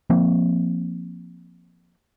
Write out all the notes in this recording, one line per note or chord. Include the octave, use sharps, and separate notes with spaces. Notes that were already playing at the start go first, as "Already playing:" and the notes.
F3 A#3 C4